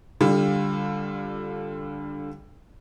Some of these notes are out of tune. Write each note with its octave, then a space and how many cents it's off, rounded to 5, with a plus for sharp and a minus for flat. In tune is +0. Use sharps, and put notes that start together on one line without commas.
D3 +0 G3 +20 F4 +20